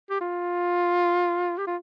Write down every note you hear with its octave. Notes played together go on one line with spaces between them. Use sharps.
G4
F4
G4
F4